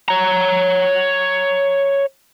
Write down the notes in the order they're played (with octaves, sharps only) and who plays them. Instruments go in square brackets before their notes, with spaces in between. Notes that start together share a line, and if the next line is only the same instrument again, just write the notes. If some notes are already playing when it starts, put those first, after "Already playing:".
[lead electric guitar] C#5 A#5